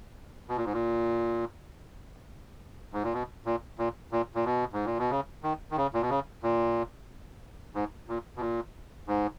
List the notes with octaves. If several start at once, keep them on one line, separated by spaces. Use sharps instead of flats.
B2
A#2
G#2
A#2
G#2
A#2
B2
A#2
A#2
A#2
A#2
B2
G#2
A#2
B2
C#3
D#3
D#3
C#3
A#2
B2
C#3
A#2
G#2
A#2
B2
A#2
G#2